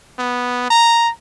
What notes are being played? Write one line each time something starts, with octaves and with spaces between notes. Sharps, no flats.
B3
A#5